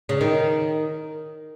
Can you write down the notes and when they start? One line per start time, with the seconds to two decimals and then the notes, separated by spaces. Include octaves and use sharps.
0.09 C#3
0.21 D#3